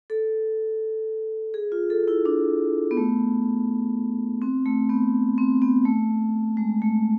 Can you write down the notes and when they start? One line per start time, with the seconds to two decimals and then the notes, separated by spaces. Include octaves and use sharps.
0.10 A4
1.54 G#4
1.72 F4
1.90 A4
2.08 E4
2.25 D4
2.91 B3
2.97 A3
4.42 C4
4.66 A3
4.89 B3
5.38 C4
5.62 B3
5.85 A3
6.57 G#3
6.82 A3